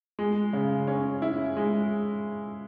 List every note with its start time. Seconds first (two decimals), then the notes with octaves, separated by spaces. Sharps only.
0.19 G#3
0.53 C#3
0.87 C#4
1.22 E4
1.57 G#3